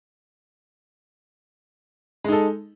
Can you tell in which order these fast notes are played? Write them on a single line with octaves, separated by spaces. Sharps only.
G#3 D#4 A4